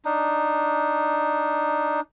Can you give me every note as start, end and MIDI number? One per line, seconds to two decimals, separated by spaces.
0.05 2.00 62
0.05 2.00 63